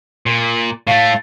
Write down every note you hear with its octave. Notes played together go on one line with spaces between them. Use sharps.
A#2
A2 A3 F5